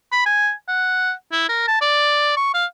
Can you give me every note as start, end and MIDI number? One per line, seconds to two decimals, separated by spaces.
0.12 0.24 83
0.26 0.52 80
0.68 1.12 78
1.32 1.45 64
1.49 1.65 70
1.68 1.78 81
1.81 2.32 74
2.37 2.49 85
2.54 2.65 77